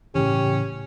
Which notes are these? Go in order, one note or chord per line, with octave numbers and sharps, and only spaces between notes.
A2 C#3 E3 C#4 G4